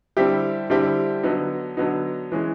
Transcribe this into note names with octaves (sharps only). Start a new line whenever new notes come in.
D3 G3 C4 E4 G4
D3 G3 C4 E4 G4
D3 F#3 B3 D#4
D3 F#3 B3 D#4
E3 G#3 C#4